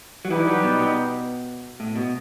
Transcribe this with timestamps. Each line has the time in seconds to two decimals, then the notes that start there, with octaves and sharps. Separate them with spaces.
0.25 F#3
0.30 E3 G3 D#4 G4 B4
0.47 F#3
0.64 B2
0.79 B2
1.80 A2
1.95 B2